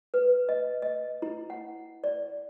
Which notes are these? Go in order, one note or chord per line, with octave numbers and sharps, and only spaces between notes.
B4
D#5
D#5
E4
F#5
D5